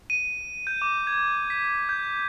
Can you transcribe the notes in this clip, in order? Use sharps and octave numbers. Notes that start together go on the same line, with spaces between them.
D#7
G6
D6
G#6
B6
G6